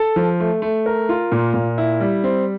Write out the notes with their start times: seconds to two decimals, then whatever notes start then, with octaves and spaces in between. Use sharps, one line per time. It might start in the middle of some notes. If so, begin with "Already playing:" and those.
Already playing: A4
0.16 F3
0.40 A3
0.62 A3
0.86 A#4
1.09 F4
1.32 A#2
1.54 A#2
1.78 E4
2.00 G3
2.24 C4